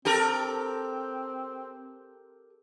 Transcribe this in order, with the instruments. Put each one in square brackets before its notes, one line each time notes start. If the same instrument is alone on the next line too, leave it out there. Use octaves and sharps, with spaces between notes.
[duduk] C4 [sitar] G4 A4 A#4